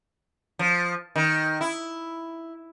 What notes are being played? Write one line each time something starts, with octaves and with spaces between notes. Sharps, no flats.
F3
D#3
E4